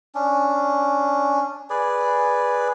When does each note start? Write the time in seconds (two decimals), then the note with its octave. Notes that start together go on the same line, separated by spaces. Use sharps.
0.15 C#4 D4
1.70 G#4 B4 D5